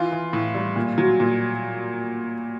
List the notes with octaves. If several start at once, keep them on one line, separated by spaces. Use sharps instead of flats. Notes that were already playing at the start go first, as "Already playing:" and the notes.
Already playing: E3 F4
E3
A2
G3
A#2
F#3
A#2